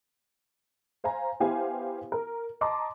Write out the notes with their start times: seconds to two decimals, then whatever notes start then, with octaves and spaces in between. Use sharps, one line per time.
1.04 C5 F5 G#5 A#5
1.40 B3 E4 G4 C5 F5 G#5
2.12 A#4
2.61 D#5 A5 A#5 C6 D6